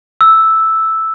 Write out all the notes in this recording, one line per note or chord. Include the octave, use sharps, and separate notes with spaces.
E6